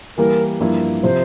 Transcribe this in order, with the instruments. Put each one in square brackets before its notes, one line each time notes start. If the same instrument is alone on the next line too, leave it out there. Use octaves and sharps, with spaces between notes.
[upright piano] E3 G3 A#3 E4 [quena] A#4
[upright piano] G2 F3 A#3 E4
[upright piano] C3 F3 C4 [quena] C5